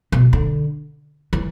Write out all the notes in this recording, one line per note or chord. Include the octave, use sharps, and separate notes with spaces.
B2
D3
E3